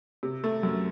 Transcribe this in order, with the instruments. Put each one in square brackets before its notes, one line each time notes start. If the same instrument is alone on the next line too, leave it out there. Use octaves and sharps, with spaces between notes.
[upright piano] C3
A3
F#2